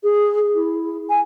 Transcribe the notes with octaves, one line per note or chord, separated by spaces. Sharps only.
G#4
E4
G#5